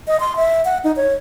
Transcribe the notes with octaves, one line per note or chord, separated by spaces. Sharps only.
D#5
C6
E5
F#5
D#4
C#5